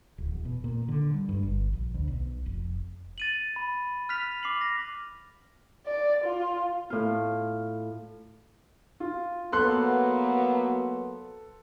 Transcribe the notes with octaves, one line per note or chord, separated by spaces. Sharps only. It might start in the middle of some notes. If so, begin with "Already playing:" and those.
D1
E2
B2
A#2
D3
G3
G2
G1
A#1
D2
B1
F1
A6 D#7 F#7
B5
F6 F#6 B6 F7
D6 C7 F#7
A#6
D5
F4
A2 F4
F4
F#3 A#3 B3 A4 C6 F#6